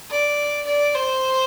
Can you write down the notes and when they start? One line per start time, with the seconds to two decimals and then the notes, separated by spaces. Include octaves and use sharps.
0.10 D5
0.66 D5
0.94 C5